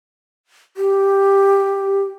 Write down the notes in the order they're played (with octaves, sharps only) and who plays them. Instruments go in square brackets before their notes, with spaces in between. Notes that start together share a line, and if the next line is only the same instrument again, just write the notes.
[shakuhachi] G4